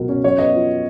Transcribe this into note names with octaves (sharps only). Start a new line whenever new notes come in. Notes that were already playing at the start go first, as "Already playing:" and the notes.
Already playing: C#2 B2 F#3 A#4
C#4
F#2 C#5
B3 D#5
F3